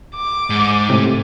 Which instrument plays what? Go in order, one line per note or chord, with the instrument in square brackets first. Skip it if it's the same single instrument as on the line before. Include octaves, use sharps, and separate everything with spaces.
[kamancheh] D6
[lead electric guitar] G#2
[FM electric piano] A2 C3